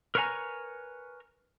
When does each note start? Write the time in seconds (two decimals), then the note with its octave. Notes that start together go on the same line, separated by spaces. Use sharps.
0.15 A#4 B4 C#5 E5 G#5 A#5